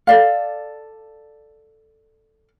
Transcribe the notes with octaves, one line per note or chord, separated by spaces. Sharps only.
A4 D5 F5